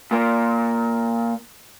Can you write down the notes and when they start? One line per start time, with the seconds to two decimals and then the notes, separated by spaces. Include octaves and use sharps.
0.11 A#2 A#3